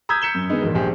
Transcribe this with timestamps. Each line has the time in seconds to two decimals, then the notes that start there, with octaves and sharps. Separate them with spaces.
0.09 A#5 D#6 E6 G6 G#6 B6
0.22 G6 B6 C#7 E7 G7
0.35 F#2
0.50 D#3 G#3 B3 D#4
0.63 E2 A#2
0.75 A#1 G4 G#4 C5